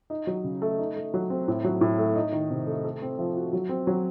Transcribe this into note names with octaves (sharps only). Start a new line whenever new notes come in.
D#4
F#3
C#3
A3
D#4
A3
F#3
C4
A2
F#3
A2
A3
D#4
D#3
C3
A3
A4
C4
F3
F#4
F#3
C4
F#3